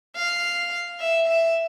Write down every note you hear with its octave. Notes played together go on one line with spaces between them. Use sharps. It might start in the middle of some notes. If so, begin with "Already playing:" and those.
F5
E5
E5